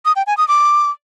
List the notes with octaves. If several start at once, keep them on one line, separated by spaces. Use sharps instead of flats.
D#6
G5
G#5
D#6
D6